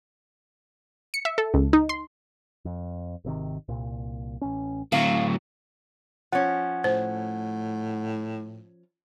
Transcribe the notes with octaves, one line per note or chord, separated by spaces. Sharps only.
C#7
E5
A4
C#2
D#4
C6
F2
G#1 C3 D#3
C2 A#2
A1 C#4
A2 D3 F#3 C4 F5
F3 C#4 F#5
A2 C5